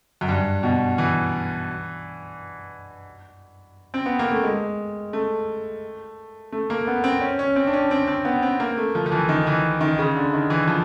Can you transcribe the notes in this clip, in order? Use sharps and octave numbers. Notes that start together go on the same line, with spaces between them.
F#2
G2
B2
E3
C4
B3
A#3
A3
G#3
A3
A3
A#3
B3
C4
C#4
C#4
C4
D4
C#4
C4
C4
B3
C4
A#3
A3
F3
F3
E3
D#3
E3
D#3
C#3
D3
D#3
E3
F3